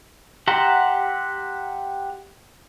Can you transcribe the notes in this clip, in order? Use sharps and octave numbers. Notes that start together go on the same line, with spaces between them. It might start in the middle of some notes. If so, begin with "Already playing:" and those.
G4 E5 F#5 A#5 C6